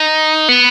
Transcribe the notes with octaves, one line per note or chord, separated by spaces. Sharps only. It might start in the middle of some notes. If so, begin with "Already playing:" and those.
Already playing: D#4
B3